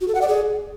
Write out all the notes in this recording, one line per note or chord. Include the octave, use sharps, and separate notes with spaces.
F#4
A4
F#5
D5
G#4